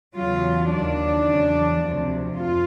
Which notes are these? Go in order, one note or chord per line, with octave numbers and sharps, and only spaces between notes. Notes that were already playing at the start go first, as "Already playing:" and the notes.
E2 C#3 F#3 F4
D#2 D#3 F#3 D4
E2 C#3 F#3
D2 C3 F3
F2 F4